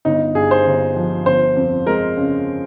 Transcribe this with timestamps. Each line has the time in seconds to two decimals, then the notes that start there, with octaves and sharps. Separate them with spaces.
0.05 G1 D#4
0.35 G2 G#4
0.51 C5
0.66 G1
0.96 F3
1.26 G1 C5
1.56 F2
1.86 G#3 A#4
2.17 C#3